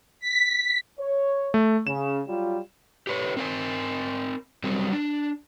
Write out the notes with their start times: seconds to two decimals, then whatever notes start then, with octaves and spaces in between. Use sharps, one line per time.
0.20 B6
0.99 C#5
1.54 A3
1.87 C#3 E7
2.28 F#3 G3 F4
3.07 G4 B4 C#5
3.37 C4 A#4 G#5
4.64 F#3 G3 C4
4.92 D4